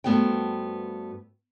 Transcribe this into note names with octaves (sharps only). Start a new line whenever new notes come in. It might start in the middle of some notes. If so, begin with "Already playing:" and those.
G2 A3 B3 F#4 C5 G5